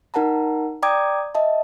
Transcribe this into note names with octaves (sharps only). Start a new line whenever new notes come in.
D#4 A#4 F#5 A5 A#5
D5 G5 A#5 D6 D#6 G#6
D#5 E5 A5